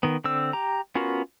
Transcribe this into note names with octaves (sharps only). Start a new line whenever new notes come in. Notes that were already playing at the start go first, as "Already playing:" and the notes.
D#3 B3
D3 C4 E6
G4 A#5
B3 C#4 F4 F#4 A#4